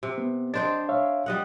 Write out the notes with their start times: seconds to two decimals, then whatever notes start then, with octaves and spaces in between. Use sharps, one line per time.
0.03 C3
0.18 B3
0.54 D4 C5 D#5 G5 A6
0.89 C#5 E5 F5
1.26 G3 D#5 F#5